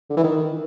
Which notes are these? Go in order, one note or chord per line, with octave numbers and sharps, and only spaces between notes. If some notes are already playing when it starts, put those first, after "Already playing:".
D3
E3
D#3